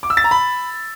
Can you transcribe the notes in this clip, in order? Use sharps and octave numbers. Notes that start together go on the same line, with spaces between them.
D6
E6
A6
A#5
B5